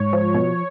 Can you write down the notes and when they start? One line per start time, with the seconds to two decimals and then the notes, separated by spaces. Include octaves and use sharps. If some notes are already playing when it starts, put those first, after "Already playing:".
Already playing: G#2 C#5
0.13 F3
0.35 B2